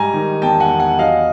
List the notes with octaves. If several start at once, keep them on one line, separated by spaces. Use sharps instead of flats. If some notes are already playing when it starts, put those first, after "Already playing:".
Already playing: G#2 G3 G#5 A#5
D#3
E2 G5 A5
F#5 G#5
E2
F#5 G#5
F#3 D#5 F5